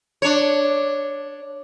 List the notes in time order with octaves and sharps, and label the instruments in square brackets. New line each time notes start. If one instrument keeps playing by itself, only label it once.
[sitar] D4 C#5